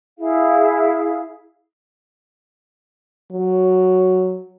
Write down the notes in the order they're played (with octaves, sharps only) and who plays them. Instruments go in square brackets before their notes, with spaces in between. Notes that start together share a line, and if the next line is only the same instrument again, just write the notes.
[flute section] E4 G#4 F5
[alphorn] F#3